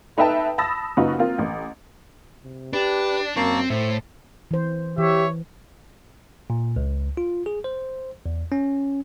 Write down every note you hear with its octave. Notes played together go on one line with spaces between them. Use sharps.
A3 D#4 B4 E5 G5 A5
A5 B5 D#6 E6 A6 A#6
F#1 C#3 D#4 F4 F#4 B4
A#3 C4 F4
A1
C3
D4 G4 B4
F#2 A#3 C4 A5 C#6
A2 C5 E5
E3 C5
E3 G4 C#5 E5
A#2
C#2
F4
G#4
C5
E2
C#4